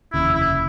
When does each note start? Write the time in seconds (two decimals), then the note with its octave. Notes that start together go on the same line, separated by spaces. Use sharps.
0.13 F1 D#2 C#3 E4
0.34 E4